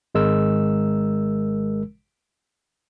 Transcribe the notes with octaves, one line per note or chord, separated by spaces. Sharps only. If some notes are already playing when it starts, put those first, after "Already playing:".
G#1 G#3 A#4 E6